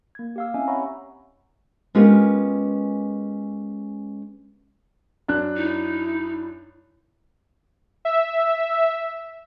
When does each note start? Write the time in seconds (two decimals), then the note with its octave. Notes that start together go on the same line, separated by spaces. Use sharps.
0.15 A#3 G#6
0.36 G4 F5 E6
0.54 C4 C#4 E4 D#5 E5 G#5
0.68 C#5 E5 F#5 A#5 B5 C#6
1.95 G#3 B3 C#4 F4 G4 A#4
5.28 F#2 D4 F#6
5.57 D#4 E4
8.05 E5